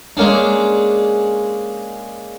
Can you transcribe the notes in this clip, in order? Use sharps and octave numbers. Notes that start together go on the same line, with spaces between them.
G#3 A#3 C#4 D4